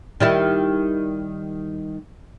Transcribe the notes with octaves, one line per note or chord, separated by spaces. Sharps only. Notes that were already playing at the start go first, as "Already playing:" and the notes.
D#3 G3 E4